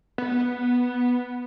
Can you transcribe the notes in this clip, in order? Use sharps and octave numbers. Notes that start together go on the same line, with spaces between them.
B3